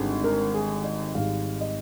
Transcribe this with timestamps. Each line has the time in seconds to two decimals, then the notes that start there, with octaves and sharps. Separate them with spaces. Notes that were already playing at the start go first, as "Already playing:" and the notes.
Already playing: G#1 D3 G3
0.24 A#4
0.54 G#4
0.84 D#5
1.15 G#1 G#2 G3 F5
1.61 D#5